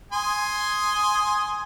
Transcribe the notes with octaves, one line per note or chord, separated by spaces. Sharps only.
G#5 C6 D#6